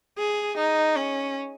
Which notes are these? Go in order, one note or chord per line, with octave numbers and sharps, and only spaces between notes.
G#4
D#4
C#4